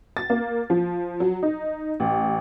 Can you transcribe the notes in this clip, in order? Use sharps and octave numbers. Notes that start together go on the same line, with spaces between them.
A6
A#3
F3
F#3
D#4
A1